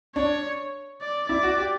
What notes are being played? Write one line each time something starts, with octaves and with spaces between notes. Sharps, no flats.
D4 C#5
D5
E4 D5
F#4
G4